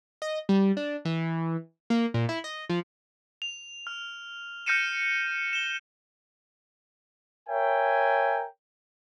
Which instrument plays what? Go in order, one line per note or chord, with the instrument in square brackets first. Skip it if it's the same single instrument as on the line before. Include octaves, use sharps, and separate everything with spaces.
[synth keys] D#5
G3
D4
E3
A#3
A#2
E4
D#5
F3
[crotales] F7
F6
F6 G6 A#6 C#7 D#7 E7
E7 G7
[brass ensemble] A#4 C#5 E5 G5 G#5